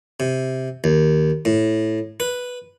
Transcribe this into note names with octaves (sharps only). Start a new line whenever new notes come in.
C3
D#2
A2
B4